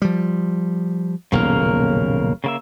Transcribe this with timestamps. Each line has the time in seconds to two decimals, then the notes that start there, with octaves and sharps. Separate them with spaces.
0.02 F3 G3
1.32 D#1 B1 F2 C#3 A#3 A#4
2.44 C#3 A#3 E5